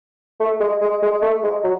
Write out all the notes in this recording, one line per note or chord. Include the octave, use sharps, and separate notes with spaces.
A3
G#3
G#3
G#3
A3
G#3
F#3